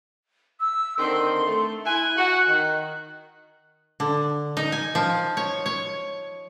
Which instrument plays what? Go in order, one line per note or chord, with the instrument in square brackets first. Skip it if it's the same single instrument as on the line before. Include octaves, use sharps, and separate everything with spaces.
[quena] E6
[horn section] D3 D#3 C4 [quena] C6
[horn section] A3
[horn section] E4 G#5 [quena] F#6
[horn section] F#4
D#3
[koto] D3
D#4
G#5
F3
C#5
C#5